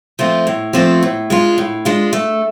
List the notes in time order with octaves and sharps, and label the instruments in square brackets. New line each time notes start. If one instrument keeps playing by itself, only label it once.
[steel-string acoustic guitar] F3 A3 C4 F4
A2
F3 A3 C4 F4
A2
G#3 D4 F4
A2
G#3 D4 F4
A3